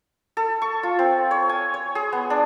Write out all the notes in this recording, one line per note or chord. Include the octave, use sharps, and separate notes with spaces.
A4
C#6
F4
C4
C#5
G#5
C#5
G#4
B3
D4